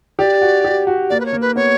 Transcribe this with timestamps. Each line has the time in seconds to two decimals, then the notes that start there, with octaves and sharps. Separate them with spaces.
0.19 G4 D5
0.42 F#4
0.64 G4
0.87 F#4
1.10 A#3 D5
1.20 B4
1.26 C#5
1.33 A#3
1.41 B4
1.56 B3 C#5